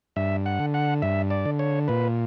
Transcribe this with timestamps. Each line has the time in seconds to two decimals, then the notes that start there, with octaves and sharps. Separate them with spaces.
0.16 G2 E5
0.46 F#5
0.59 D3
0.74 F#5
1.02 G2 E5
1.31 D5
1.46 D3
1.59 C#5
1.88 A#2 B4